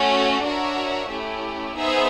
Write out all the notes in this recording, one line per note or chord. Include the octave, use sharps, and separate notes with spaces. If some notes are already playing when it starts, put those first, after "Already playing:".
Already playing: A3 C#4 F#4
D4 F#4 A#4 C#5 E5
A3 C#4 E4 G4
B3 D#4 G#4 C5 E5